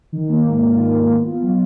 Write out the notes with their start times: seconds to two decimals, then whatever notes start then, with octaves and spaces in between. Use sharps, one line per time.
0.13 D#3
0.29 A#3
0.45 G#2
0.61 F4
0.78 D#3
0.93 A#3
1.10 B3
1.27 F4
1.42 F#3